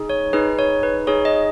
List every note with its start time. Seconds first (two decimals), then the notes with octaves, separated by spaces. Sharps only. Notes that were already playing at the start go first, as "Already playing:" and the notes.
Already playing: D#4 G#4
0.10 C#5
0.33 D#4 G#4 B4
0.59 C#5
0.83 B4
1.07 D#4 G#4 C#5
1.25 D#5